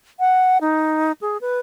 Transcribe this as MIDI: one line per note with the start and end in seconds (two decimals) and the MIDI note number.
0.20 0.58 78
0.61 1.12 63
1.21 1.37 68
1.41 1.59 71